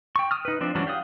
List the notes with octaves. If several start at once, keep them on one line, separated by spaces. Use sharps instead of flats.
G5 C#6
D#6 F6
D#4 B4
F3 C4 D4
E3 F#3 G3 C#4 D4
G4 F5 F#5 D#6